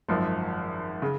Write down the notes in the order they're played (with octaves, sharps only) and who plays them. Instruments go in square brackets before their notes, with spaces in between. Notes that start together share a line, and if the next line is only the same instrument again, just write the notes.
[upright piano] G#1 F#2 F3
C#3